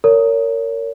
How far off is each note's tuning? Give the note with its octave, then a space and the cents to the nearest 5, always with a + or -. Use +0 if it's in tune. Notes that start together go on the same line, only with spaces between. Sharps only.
A#4 -20 C#5 +20